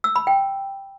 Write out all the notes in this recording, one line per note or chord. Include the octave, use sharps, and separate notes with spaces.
E6
B5
G5